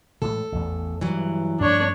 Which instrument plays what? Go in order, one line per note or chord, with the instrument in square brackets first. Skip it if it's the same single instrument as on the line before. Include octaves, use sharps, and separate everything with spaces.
[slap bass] A2 E3 G#3 [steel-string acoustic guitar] A4
[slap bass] A1 E2
[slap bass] G2 G3 [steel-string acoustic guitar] E3 F#3
[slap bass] G2 F3 A3 [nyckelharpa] D4 C#5